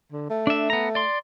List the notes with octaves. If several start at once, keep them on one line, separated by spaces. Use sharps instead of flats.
D3
A3
D4 E5
B3 A#5
D5 C6